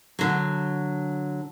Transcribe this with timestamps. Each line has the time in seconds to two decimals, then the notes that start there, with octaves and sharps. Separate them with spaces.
0.19 D3 F#3